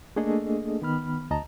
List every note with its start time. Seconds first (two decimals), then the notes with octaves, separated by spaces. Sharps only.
0.16 A3 A#3 D4 G#4 A4 D#5
0.82 D#3 B3 B5 F6
1.31 D2 D#5 A5 A#5